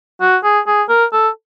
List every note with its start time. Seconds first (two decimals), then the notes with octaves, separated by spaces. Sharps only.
0.21 F#4
0.44 G#4
0.67 G#4
0.89 A#4
1.13 A4